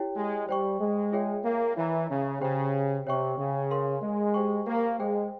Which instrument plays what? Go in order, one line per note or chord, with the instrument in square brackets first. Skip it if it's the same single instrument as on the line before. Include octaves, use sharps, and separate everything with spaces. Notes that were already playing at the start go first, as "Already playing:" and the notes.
Already playing: [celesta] E4 G4 C#5 G5
[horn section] G#3
[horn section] G3 [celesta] C5 G5 C#6
[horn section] G#3
[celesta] F4 G#4 C#5 E5 G5
[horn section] A#3
[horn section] E3 [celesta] C#5 E5 A#5
[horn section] C#3
[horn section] C#3 [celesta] G4 C5 G5
[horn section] C3 [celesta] C#5 G5 C#6
[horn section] C#3
[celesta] A#4 F5 C6
[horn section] G#3
[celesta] G4 C5 G5 C#6
[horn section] A#3
[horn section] G#3 [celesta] G#4 C5 G5